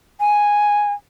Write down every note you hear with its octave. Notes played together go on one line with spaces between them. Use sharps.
G#5